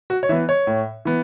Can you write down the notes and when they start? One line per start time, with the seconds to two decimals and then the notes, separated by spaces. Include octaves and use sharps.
0.10 F#4
0.23 C#5
0.29 E3 B3 E5
0.49 C#5
0.67 A2
1.05 E3 B3